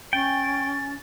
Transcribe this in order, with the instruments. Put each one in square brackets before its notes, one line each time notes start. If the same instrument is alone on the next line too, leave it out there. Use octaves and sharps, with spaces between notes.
[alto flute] C#4 [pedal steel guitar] G5 [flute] A6